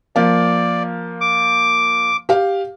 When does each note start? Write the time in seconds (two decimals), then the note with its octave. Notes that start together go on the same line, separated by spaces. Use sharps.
0.16 F3 A#3 D5 F5
1.21 D6
2.29 G4 F5